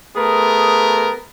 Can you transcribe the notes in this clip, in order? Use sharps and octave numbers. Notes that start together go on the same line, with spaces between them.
A3 B3 G#4 A#4